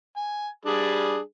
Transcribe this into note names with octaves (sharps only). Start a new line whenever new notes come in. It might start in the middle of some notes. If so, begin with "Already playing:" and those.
G#5
G3 D4 G#4